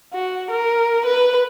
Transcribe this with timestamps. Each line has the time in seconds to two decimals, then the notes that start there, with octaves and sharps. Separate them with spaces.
0.13 F#4
0.50 A#4
1.05 B4